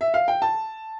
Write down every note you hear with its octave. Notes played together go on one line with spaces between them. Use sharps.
E5
F5
G5
A5